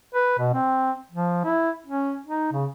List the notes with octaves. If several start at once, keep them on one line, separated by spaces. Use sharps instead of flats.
B4
B2
C4
F3
E4
C#4
D#4
C#3